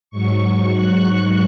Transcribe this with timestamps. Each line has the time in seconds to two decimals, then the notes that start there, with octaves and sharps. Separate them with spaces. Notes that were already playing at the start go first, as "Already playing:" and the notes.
0.10 G#2 F#3 C#6
0.72 F#6